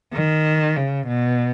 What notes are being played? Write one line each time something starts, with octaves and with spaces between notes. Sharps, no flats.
D#3
C#3
B2